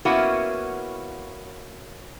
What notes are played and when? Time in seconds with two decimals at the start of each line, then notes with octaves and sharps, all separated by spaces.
0.05 A#3 B3 C#4 E4 F#4